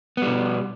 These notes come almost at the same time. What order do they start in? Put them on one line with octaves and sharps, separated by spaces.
B3 G3 B2